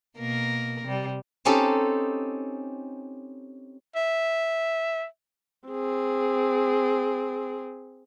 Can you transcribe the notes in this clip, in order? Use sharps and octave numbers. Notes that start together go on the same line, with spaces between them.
B2 A#3 A#4
C3 G3
C4 C#4 D#4 G4 A4
E5
C4 G#4